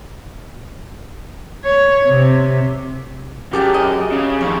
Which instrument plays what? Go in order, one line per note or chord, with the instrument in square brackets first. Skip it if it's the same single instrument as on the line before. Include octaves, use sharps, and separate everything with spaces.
[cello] C#5
C3
[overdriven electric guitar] F#2 [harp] G4 G#4 [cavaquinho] G5 A5 D6
[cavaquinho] D#5
[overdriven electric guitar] C#3
[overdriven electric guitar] F2 D#3 [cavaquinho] C#5